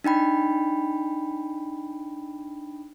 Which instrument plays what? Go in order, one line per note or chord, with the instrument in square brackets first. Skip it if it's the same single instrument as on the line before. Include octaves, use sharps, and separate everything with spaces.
[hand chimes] D4 D#4 G5 B5